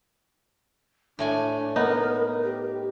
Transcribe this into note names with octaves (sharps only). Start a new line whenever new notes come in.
A2 A3 D4 G#5
B3 D#4 A#4
G4